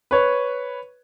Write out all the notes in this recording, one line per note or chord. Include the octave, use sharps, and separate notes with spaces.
B4 C#5